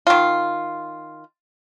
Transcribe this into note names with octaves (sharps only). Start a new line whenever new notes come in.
D#3 F4